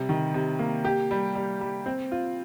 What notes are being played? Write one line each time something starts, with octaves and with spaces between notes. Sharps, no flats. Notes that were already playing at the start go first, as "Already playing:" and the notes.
Already playing: C3 G3
D#3
C3
A#3
G4
G3
G3
G3
C4
F4